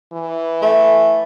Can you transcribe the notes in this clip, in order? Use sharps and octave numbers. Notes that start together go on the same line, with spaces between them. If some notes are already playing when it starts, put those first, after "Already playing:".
E3
A3